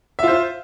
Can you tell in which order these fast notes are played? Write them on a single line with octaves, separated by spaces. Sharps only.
E5 F4 C5